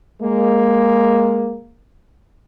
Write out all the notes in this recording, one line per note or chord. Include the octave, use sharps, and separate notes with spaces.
G#3 A#3